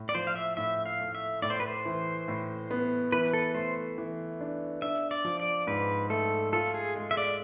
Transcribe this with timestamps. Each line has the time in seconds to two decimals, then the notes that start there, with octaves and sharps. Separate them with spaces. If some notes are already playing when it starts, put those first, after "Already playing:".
Already playing: A2
0.09 D5
0.15 F3 C5
0.27 F5
0.36 E5
0.57 A2 E5
0.86 F5
1.00 A3
1.15 E5
1.42 A2 D5
1.50 C5
1.60 B4
1.68 C5
1.86 E3
2.28 A2
2.71 B3
3.12 E3 B4
3.33 A4
3.54 A3 C5
3.98 E3
4.41 D4
4.82 D4 E5
5.11 D5
5.25 F3
5.40 D5
5.67 G#2 B4
6.10 A3 A4
6.53 F4 A4
6.74 G#4
6.96 G#3
7.11 E5
7.17 D5